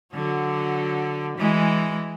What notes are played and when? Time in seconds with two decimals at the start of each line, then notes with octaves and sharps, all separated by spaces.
0.13 D3 F#3
1.38 E3 G#3